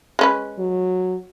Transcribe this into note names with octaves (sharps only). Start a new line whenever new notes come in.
G#3 C#4 B4
F#3